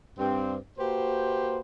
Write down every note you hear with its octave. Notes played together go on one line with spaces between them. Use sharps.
G2 C4
A#3 F#4 G4 B4 C5